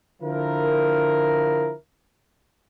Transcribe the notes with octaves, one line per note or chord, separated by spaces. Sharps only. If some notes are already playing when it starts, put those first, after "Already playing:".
D3 F3 E4 A#4